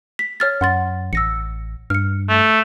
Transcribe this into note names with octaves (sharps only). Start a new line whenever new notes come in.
B6
C#5 F6 A6
F#2 F#5 C6 A6
A1 E6 A#6 C#7
G2 F6 C#7
A3